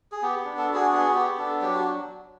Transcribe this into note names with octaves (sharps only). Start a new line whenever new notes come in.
G#4
B3 G4
D4
A4
F#4
G#4
B3 G#4
B3 G4
D4 A4
F#3 G4
F#4